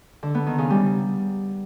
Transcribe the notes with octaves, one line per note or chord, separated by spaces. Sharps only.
D3
B3
D#3
C#3
G3